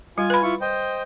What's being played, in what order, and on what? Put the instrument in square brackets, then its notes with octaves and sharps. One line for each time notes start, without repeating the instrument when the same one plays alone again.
[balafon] G3 [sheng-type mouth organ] F4 G#5
[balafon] B4 B5
[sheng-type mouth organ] E4 F4 C#6
C5 D#5 G5